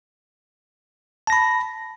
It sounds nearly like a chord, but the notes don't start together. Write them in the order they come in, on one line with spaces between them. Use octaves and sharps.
A5 A#6 B5